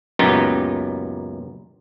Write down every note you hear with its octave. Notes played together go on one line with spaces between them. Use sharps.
C#2 F#2 A#2 B3 D#4 G4